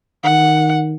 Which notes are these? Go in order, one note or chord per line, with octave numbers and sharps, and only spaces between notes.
D#3 F#5